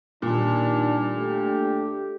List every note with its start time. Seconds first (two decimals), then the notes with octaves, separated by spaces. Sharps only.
0.22 A#2 D#3 G3 D4
1.14 A3 D4 G4